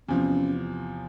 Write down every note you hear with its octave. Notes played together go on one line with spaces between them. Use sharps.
E2 C3 F3 C#4